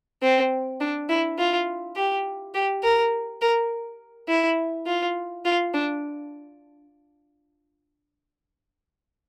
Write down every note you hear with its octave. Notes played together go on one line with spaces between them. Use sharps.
C4
D4
E4
F4
G4
G4
A#4
A#4
E4
F4
F4
D4